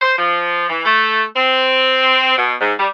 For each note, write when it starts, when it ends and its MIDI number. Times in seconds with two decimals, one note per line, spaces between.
0.02 0.16 72
0.18 0.68 53
0.69 0.84 52
0.86 1.24 57
1.36 2.35 60
2.37 2.54 47
2.61 2.73 44
2.79 2.87 55